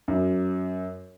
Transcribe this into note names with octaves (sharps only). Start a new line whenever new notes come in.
F#2